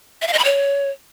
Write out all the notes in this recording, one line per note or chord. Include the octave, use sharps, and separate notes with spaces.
E5
F5
D#5
B5
C#5